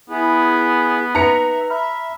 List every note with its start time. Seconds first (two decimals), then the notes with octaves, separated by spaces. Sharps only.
0.10 B3 E4 G#4
1.15 D#4 B4 E5 A#5 C#7
1.70 E5 B5 F6